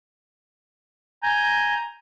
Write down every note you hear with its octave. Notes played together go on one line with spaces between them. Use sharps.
G#5 A#5 G6